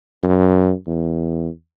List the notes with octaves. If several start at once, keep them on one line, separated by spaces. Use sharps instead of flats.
F#2
E2